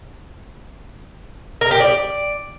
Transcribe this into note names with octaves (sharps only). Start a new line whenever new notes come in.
A#4
G4
D5